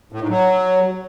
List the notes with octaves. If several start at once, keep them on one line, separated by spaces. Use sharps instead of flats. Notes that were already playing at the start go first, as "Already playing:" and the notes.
A2
G#2
F#3